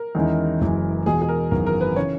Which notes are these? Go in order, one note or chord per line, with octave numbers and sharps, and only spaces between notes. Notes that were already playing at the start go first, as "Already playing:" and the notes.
Already playing: A#4
E2 D#3 G#3 C#4 E4
F#1 F#2 E3 G#3
E2 B2 G#3 G#4
G#4
A#4
G#1 F#2 E3 B3 F#4 A#4
A#4
B4
C#3 E3 C#5